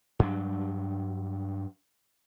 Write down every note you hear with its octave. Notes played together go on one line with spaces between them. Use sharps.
G2 F#3 D4